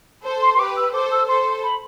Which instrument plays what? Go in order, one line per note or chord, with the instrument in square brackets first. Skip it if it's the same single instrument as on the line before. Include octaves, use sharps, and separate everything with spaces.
[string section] A4 C5
[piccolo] C6
C6
[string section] G4 B4 [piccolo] D6
[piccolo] E6
[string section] A4 C5 [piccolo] D6
[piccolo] E6
[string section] A4 C5 [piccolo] C6
[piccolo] B5